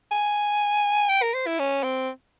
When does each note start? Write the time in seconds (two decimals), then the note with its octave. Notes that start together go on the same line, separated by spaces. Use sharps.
0.11 G#5
1.09 G5
1.22 A#4
1.34 C5
1.47 E4
1.59 C#4
1.83 C4